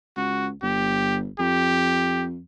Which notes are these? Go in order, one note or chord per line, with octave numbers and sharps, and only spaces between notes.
C#2 F#4
G1 G4
F2 G4